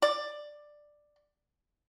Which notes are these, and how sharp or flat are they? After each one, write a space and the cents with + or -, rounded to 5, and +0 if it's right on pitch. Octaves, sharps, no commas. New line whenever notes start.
D5 +10